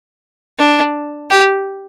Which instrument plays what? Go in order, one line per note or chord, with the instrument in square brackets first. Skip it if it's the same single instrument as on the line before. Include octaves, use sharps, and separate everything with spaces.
[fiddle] D4
G4